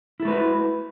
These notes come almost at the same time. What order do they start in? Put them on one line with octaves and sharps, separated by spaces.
E4 A4 A3 B4 F#4